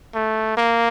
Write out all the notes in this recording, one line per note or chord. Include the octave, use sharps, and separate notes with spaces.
A3
A#3